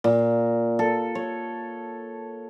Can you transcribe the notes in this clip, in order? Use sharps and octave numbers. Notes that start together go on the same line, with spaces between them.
A#2
A4
C#5